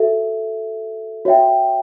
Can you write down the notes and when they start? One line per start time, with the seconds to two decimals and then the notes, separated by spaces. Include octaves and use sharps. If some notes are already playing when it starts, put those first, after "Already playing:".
Already playing: F#4 A4 E5
1.25 F#4 C#5 E5 G5